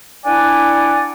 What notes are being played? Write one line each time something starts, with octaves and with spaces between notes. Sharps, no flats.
D4 E4 D5 F#5 G#5